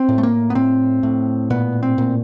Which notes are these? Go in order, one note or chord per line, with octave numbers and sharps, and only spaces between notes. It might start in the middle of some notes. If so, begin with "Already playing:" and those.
Already playing: C4
A2
A3
A#3
B3
A2 C4
A2
A#2 B3
C4
A#2